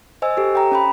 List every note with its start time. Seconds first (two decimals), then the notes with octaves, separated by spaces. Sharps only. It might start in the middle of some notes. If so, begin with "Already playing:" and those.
0.22 C5 D#5 G#5 E6
0.37 G4 A4
0.55 G5 A#5
0.72 C#4 G5 B5